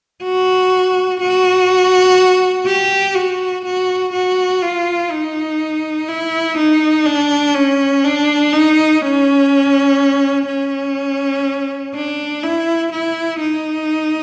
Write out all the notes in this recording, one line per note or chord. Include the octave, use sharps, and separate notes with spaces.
F#4
F#4
G4
F#4
F#4
F#4
F4
D#4
E4
D#4
D4
C#4
D4
D#4
C#4
C#4
D4
E4
E4
D#4